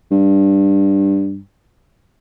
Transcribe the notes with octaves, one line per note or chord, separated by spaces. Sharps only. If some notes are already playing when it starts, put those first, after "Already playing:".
G2